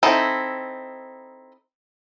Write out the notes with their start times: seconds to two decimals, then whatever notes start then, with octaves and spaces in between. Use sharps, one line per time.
0.03 C4 D#4 E4 A4